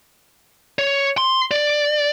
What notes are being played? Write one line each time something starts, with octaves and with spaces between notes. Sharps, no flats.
C#5
C6
D5